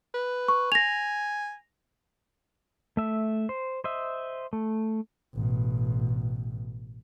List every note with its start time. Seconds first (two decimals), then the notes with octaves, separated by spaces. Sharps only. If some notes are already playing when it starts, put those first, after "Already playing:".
0.14 B4
0.48 C#6
0.72 G#5 A#6 F7
2.97 A3 E5
3.49 C5
3.84 C5 D#5 E5
4.53 A3
5.35 A1 B2